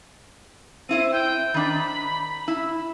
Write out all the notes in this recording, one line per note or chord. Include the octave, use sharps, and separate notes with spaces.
C4 E4 C5 D#7
G5
D#3 D4 B5
E4